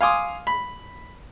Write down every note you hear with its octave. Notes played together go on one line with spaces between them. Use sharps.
F5 G#5 C6 D6 D#6
B5